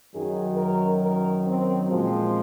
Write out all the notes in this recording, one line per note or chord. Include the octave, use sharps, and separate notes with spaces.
F#2 D#3 F#3 G#4
A#4
A#4
C4
A#2 F3 G#3 C4